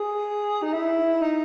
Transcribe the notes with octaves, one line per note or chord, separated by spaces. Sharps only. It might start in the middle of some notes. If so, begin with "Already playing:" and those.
Already playing: G#4
D#4
E4
D#4